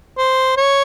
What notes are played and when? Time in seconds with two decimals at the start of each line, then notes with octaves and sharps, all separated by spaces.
0.18 C5
0.57 C#5